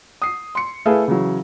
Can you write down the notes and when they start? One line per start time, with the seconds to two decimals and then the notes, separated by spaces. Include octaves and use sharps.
0.22 D#6 C7
0.55 C6 C#7
0.86 A3 E4 G#4 A4 B4 F5
1.08 C#3 E3 F#3